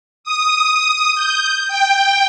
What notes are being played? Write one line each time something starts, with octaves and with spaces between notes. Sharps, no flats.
D#6
G6
G5